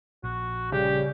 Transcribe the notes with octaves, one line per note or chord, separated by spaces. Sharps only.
A#1 F#4
C#3 G3 G4